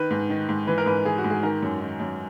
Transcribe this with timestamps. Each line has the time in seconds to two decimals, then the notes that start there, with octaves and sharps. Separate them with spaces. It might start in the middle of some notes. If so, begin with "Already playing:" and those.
Already playing: D#3 B4
0.11 G#2
0.30 D#3
0.49 G#2
0.67 E3 B4
0.78 A#4
0.86 G#2 B4
1.05 E3 G#4
1.18 F#4
1.24 G#2
1.30 G#4
1.43 D#3 A#4
1.63 F#2
1.81 D#3
2.00 F#2